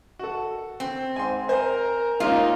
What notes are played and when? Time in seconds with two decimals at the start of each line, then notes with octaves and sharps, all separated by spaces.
0.19 F#4 A4
0.80 C4
1.16 G#2 G#5 C6
1.49 A#4 C5 G#5
2.20 G#3 A#3 C#4 D#4 F4